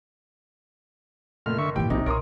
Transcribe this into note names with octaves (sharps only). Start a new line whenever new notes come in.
F#1 A#2 A3 F6
D3 E5 C#6
G#1 A#2 D#3 E3 G4 G5
A#1 C3 D#4
B1 A#2 A#4 C#5 C6 D#6